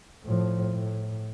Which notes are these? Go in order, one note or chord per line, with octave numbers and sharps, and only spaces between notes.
A2 F3
A2